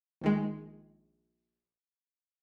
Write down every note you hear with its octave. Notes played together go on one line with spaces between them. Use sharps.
A#1 D#3 G#3